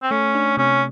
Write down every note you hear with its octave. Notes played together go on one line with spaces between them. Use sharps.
C4
A3 C#4
D4
C3 C#4